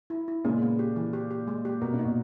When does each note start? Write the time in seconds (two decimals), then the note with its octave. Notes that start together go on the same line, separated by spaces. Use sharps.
0.10 E4
0.28 E4
0.45 A#2 C#3 G#3
0.62 B3
0.79 G4
0.96 E3
1.13 G4
1.31 G4
1.47 G#3
1.65 G4
1.81 B2 A#4
1.93 A#2
1.99 D#4
2.04 B2